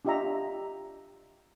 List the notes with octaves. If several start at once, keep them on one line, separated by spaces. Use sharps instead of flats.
D4 F4 G4 D#5 E5 A#5